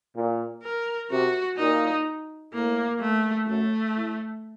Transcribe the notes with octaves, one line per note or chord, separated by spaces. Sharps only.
A#2
A#4
C3 F#4
A#2 D#4
A2 A#3
A3
F#2 A3
A2